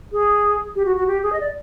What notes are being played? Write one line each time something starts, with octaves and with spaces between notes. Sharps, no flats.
G#4
G4
F#4
F#4
G4
G#4
D#5
D5